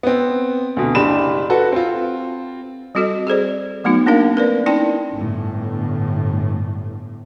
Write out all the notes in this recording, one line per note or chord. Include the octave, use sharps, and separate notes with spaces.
B3 C4
D2 B2
F#1 D4 G4 B5 E7
F#4 A4 B4
C4 F4
G3 C4 F#4 A4 D#5
G#4 A4 C5 D5
F#3 A3 B3 D#4 F#4
A#3 C4 D4 D#4 A#4 F5
A#4 B4 D5
C#4 D#4 E4 D5 G5 A5
G1 A2